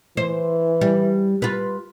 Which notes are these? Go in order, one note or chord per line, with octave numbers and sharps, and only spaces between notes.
E3 C5
G3
F4 B4